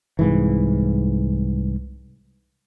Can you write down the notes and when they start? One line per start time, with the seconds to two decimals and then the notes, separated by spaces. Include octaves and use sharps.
0.19 C2 G#2 E3